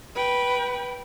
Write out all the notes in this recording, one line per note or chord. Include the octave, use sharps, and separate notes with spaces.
B4 G5